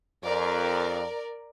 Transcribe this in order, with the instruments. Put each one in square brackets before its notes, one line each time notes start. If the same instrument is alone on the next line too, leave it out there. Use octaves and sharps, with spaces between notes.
[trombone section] F2 [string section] A#4 D5